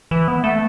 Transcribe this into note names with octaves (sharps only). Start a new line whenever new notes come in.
E3
B3
A3